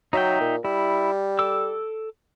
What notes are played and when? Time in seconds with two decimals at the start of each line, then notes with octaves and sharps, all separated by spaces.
0.13 F#3 D#4 E5 G5
0.41 A#2
0.65 G3 E4
1.39 A4 D6 E6